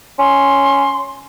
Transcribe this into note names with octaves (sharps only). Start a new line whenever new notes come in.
C#4 C6